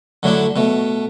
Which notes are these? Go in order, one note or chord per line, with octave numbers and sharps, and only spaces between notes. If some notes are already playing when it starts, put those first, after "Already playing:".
D3 F#3 A3 D4 E4
B2 A3